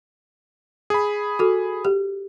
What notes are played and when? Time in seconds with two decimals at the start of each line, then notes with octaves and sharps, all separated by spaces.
0.90 G#4 B5
1.39 F#4 A4
1.85 G4